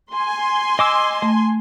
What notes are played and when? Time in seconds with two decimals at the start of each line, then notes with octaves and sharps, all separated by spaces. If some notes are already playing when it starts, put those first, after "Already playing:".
0.13 G#5 C6
0.79 D#5 D6 E6
1.22 A3